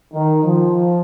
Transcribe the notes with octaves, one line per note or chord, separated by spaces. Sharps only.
D#3
F3